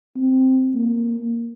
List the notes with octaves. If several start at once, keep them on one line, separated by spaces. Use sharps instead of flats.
C4
A#3